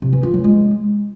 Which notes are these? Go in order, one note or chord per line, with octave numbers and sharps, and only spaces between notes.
C3
E3
F4
F#3
G#3